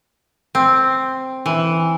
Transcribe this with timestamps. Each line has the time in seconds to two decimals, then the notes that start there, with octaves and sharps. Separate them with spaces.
0.55 C4
1.46 E3